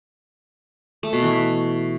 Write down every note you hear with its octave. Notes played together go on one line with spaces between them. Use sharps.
A3
B2
E3